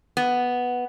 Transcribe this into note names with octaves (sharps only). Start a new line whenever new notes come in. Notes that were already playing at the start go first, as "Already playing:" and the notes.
B3